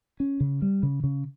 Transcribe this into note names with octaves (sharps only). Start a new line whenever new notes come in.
C#4
C#3
G3
C#3
C#3